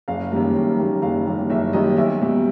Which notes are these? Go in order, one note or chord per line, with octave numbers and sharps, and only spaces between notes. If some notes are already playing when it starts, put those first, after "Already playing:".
F#1 F5
F#2 D#3 G3 A#3
F#1
F#2 D#3 G3 A#3
F#1 F5
F#2 D#3 G3 A#3
F#1 E5
F#2 D#3 G3 A#3 D#5
B1 E5
B2 G3